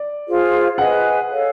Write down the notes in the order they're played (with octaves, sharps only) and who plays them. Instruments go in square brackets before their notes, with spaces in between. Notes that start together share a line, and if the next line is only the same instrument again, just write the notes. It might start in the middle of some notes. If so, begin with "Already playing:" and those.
Already playing: [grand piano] D5
[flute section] F4 G#4 C5
[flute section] G#4 B4 D#5 G#5 [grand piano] F#5
[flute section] A4 C#5 F5